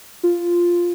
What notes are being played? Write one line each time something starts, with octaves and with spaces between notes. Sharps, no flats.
F4